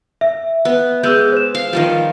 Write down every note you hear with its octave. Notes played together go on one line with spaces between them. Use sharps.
E5
B3
G#3 B3 G#4 E6 G6
C5 E7
F5
D#3 F3 G3